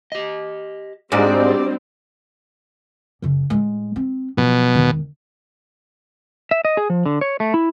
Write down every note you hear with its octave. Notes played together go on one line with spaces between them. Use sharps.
G4 D#5
G#2 G3 C4 D4 F#4 D5 D#5
F#2 C#3
A2 G#3
C4
B2 F3 F#3
E1 D#3
E5
D#5
G#4
F3
D3
C#5
A3
E4